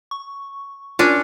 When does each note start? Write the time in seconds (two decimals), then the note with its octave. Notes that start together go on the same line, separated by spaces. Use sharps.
0.11 C#6
0.99 C#4 D4 F4 A#4 D5